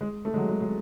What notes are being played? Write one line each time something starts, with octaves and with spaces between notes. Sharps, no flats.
G#3
A3
G#3
F#3
G#3
G#3